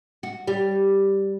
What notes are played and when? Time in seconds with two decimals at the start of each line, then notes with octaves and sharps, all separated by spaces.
0.23 F#4
0.48 G3